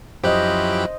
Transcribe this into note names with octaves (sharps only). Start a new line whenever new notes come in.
F#2 F3 E4 G4 C5 D#5 G5 F#6